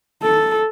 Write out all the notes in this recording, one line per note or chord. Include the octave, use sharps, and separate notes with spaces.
A4